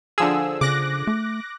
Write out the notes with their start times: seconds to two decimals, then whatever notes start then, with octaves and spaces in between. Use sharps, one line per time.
0.18 D3 F3 G#4 E6
0.61 C#3 D6 F#6 A#6
1.07 A3